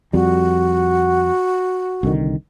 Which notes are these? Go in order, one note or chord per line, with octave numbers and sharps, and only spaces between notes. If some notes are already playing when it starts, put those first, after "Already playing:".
F2 G3 F#4
C2 D3 D#3